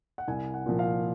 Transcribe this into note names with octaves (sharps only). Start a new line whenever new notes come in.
F#5
C2 G#5
F#5
A#2 F3
F5